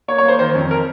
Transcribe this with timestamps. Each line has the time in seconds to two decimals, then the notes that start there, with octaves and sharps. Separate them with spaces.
0.08 A#3 C#5
0.18 C#5
0.23 A#3
0.28 C5
0.39 D#3 C5
0.55 F2
0.71 A#4